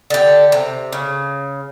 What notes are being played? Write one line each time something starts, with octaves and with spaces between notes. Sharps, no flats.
D3 G4
C3
C#3